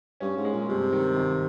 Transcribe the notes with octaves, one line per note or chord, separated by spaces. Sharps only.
G2 C#4
G#2
G#3
A#2
G2 C3
D#3
G#1